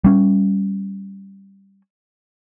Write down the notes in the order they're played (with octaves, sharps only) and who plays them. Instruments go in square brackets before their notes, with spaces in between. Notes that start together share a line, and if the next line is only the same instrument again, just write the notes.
[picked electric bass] G3 C#4